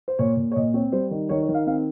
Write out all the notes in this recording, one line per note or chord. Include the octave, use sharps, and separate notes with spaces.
C5
A#2 C#5
A#2
C#5
A#2 D#5
C4 C#5
G3 C5
D#3
D#3 C#5
C#5
D#3
F5
C4 F5